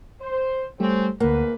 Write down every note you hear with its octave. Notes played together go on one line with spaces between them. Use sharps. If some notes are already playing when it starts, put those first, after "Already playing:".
C5
G3 A3 C4 C#4 G4 C5
D2 G#2 A#3 B4 F#5